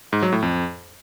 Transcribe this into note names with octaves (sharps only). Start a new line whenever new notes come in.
G#2
F#3
A2
F2